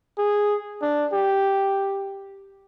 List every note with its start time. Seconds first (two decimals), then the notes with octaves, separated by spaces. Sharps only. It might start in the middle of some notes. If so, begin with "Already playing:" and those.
0.18 G#4
0.82 D4
1.13 G4